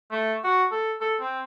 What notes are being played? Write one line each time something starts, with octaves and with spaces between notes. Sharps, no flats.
A3
F#4
A4
A4
C4